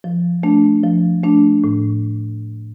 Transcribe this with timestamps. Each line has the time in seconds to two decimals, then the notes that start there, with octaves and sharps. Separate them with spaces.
0.04 F3
0.43 A3 D4
0.83 F3
1.24 A3 D4
1.64 A2